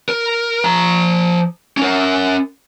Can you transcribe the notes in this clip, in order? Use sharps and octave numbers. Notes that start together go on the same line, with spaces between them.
A#4
F3 A#5
C#4 A#4